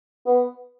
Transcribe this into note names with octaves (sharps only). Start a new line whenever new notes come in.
B3